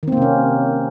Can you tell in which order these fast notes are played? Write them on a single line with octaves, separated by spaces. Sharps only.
D#3 C4 A#3 C3 C#4